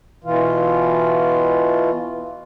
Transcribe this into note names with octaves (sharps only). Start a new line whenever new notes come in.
B2 E3 F4